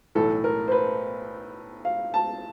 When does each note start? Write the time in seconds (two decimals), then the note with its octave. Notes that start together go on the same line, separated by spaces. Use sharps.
0.15 B1 A2 E3 A4
0.44 A#4
0.68 C5
0.72 B4
1.85 F5
2.14 A5